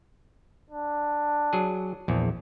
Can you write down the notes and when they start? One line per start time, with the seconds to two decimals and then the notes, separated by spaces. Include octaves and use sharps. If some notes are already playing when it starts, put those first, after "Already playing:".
0.70 D4
1.53 F#3 G#4
2.08 A#1 E2